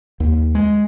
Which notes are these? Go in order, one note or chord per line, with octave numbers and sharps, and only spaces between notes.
D#2
G#3